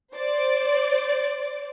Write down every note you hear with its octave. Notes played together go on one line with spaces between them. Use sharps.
C5 D5